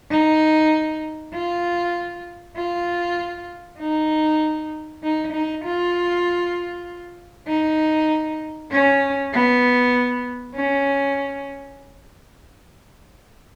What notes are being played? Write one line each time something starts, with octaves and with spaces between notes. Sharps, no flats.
D#4
F4
F4
D#4
D#4
D#4
F4
D#4
C#4
B3
C#4